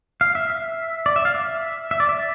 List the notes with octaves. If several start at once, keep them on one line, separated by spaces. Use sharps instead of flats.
F5
E5
E5
D5
E5
F5
E5
E5
D5
E5